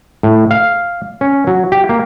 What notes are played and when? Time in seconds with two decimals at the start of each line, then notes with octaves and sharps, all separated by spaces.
0.23 A2
0.51 F5
1.21 C#4
1.47 F#3
1.72 G4
1.89 A#3